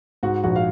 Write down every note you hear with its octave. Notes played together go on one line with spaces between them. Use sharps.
G#2 F#4
A#1 F#4
F5